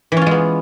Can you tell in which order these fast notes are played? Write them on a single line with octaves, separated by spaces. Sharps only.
E3 C#4 F4 G#3 B3